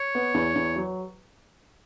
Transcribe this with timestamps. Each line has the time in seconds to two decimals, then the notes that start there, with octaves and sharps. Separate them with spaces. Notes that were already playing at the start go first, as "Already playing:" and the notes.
Already playing: C#5
0.15 B3
0.34 E2
0.55 E2
0.76 F#3